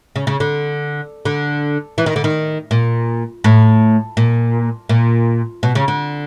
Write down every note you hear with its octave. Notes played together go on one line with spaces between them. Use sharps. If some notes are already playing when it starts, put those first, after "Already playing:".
C#3
C#3
D3
D3
E3
D#3
D3
D#3
A#2
A2
A#2
A#2
B2
C#3
D3